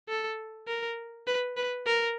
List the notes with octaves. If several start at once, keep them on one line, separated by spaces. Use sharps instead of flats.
A4
A#4
B4
B4
A#4